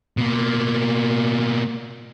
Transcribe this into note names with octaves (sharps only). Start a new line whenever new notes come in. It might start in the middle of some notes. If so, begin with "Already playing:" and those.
B2 A#3